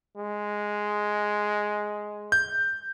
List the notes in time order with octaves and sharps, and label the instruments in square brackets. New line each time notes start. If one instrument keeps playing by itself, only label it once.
[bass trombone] G#3
[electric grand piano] G6